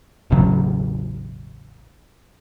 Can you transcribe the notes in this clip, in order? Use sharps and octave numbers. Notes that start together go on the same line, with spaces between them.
E1 A1 C#3 F#3